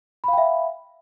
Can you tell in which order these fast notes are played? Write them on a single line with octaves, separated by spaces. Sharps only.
B5 F5 G5 E5